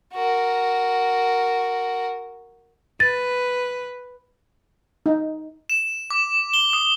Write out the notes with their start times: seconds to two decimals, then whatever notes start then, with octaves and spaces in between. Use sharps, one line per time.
0.13 F#4 A#4
3.00 B4 A6
5.06 D#4
5.70 E7
6.11 D6
6.54 G7
6.73 D#6